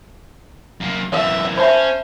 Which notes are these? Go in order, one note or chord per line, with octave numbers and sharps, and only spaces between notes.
F#2 A#3
F#2 E3 E5
C#4 C5 E5 A5 B5